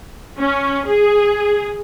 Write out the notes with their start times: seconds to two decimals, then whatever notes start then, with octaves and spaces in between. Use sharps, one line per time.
0.38 C#4
0.85 G#4